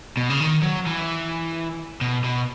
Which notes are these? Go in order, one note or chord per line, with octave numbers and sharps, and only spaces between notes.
B2
C#3
D#3
F#3
E3
B2
B2